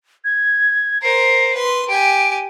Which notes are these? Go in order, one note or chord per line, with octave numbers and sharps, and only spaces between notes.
G#6
A#4 C5 C7
B4 C6
G4 G#5 D7